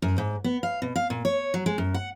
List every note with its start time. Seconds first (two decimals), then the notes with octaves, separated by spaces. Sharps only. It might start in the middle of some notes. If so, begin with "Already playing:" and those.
0.02 F#2
0.18 G#2
0.44 B3
0.63 F5
0.82 B2
0.96 F5
1.10 A#2
1.25 C#5
1.54 F#3
1.66 G#3
1.78 F#2
1.94 F#5